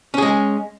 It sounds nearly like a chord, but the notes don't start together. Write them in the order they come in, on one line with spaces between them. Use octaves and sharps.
C#4 G#4 G#3